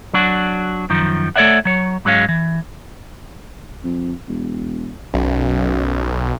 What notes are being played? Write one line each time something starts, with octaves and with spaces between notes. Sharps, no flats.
F#3 D4 F#4
F#2 D#3 F3
A3 A4 C#5 D5 E5 F#5
F#3 C#5
G#2 F#3 G#3 C#4 F5
E3
F2
E1
B1 F#2